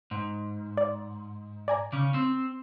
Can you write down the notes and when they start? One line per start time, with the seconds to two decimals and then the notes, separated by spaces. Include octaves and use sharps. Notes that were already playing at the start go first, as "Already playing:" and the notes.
0.11 G#2
0.77 D5
1.68 D5 G#5 A#5
1.92 C#3 C#4 D6
2.14 C4